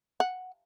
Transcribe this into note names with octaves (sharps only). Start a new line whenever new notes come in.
F#5